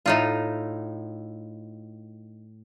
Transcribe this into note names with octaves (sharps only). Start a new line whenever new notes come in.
A2 D#4 F4